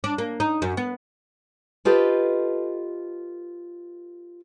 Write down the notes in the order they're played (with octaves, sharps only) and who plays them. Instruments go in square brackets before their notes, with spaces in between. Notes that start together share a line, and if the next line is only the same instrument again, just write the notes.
[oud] D4
A#3
D#4
F#2
B3
[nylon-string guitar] F4 G4 A4 B4 C5 D#5